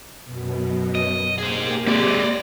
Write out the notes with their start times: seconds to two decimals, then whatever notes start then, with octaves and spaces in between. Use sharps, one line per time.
0.25 F#2 B2
0.95 D#5
1.39 A#3 G4 G#4 C5
1.87 A#3 G4 G#4 D5 E5 A#6